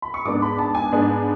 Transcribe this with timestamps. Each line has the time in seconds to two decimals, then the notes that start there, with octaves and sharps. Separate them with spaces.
0.02 B5
0.14 C#6
0.25 G#2 G#3 B3 D4 D6
0.42 B5
0.59 A5
0.75 G#5
0.92 G#2 G#3 B3 D4